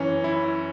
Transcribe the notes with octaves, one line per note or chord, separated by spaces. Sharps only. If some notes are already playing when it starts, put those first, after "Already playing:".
Already playing: F#2 E3 C#4 C#5
E4